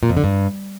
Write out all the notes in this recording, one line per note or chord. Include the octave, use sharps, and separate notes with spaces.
A#2
F2
D3
G2